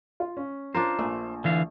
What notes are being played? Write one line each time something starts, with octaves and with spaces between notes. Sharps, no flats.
F4
C#4
D4 F4 A#4 C5
A#1 A3
D3 E3 F5